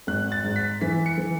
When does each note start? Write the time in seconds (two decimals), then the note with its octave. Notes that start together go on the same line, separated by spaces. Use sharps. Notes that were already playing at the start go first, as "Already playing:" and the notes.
0.07 G#1 F#6
0.32 A6
0.44 G#2
0.56 B6
0.81 E3 B6
1.06 C#7
1.18 E3